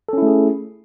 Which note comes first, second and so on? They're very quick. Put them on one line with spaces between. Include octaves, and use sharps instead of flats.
A4 C#4 E4 A3 G#4